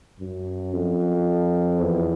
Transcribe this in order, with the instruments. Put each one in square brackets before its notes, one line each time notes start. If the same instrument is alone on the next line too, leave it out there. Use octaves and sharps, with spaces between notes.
[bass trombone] F#2
F2
E2